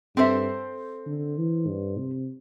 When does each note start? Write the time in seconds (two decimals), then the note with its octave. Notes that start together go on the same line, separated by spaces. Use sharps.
0.16 G2 C4 A4 C5 E5
1.07 D3
1.38 E3
1.68 G2
1.98 C3